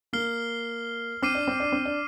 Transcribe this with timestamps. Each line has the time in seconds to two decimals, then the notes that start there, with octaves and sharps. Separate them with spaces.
0.13 A#3 F6 C7 G7
1.22 C4 D6 F6 C7 D#7
1.35 D4
1.47 C4
1.60 D4
1.72 C4
1.85 D4